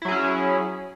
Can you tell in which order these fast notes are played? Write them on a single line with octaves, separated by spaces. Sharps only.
E4 F#3 G#4 C#4